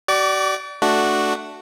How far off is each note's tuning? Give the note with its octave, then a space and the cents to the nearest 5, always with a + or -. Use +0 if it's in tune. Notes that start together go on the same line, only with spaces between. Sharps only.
F#4 +45 D5 +0 D6 -45
A3 +0 D4 +0 F#4 +0